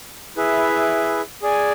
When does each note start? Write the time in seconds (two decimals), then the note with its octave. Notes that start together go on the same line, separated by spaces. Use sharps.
0.37 E4 G#4 B4 E5
1.42 G#4 D5 G#5